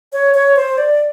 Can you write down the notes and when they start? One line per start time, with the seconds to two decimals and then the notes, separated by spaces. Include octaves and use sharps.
0.13 C#5
0.34 C#5
0.56 C5
0.78 D5